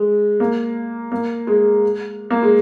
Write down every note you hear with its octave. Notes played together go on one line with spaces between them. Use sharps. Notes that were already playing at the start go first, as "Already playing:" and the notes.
Already playing: G#3
A#3
A#3
G#3
A#3
G#3